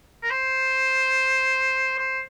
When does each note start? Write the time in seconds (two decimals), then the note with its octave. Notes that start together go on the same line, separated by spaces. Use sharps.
0.23 A#4
0.30 C5
1.98 C5